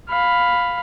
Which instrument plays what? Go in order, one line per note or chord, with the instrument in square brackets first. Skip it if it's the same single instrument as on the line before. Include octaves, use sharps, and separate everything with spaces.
[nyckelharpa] F5 B5